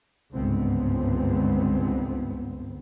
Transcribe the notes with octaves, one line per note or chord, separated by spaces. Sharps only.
G1 C#2 G#2 D3 B3 C4